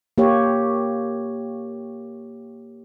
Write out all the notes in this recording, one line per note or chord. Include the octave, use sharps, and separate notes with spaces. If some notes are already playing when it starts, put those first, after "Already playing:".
A#3 G4 C#5